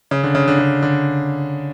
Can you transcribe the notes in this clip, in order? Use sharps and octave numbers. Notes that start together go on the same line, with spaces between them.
C#3
D3
C#3
D3
C#3
D3